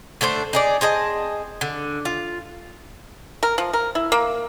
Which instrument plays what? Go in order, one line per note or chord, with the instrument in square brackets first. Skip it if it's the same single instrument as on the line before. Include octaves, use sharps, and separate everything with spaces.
[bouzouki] D3 A3 D4 C5
D#4 G#4 D5
C4 G#4 D#5 A5
D3
F4
[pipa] A#4
F3
A#4
E4
A#3